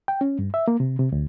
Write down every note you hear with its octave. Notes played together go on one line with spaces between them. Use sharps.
G5
C#4
G2
E5
A#3
C3
C3
D2